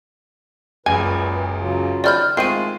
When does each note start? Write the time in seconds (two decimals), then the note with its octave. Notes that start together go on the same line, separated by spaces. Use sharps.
0.86 F#1 C#2 F#2 A#2 B4 G#5
1.60 C#3 F#3 F4
2.04 D#3 C5 D5 B5 F6 G6
2.37 D#3 G#3 A3 C4 F4 C7 D#7